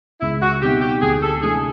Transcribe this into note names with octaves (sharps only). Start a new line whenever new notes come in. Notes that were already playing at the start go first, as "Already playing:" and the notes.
C#2 E4
F#4
B2 G3 C4 D#4 G4
G4
D2 G#4
A4
C3 E3 A3 D4 G#4